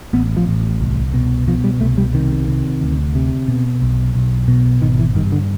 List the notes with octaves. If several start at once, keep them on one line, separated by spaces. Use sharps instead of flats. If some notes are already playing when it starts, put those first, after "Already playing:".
A1 B3
F3
A1
C2
B2
B2 F3
G3
C2 A3
G3
C3 D#3
C3
D2
C3
B2
B1
B1
B2
G#1 D#3
E3
G2 D#3
D3